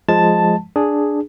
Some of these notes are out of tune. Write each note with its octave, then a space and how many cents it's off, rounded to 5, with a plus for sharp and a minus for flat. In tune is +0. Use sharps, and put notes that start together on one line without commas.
F3 +0 G#3 +0 A5 +0
D4 +0 G#4 +0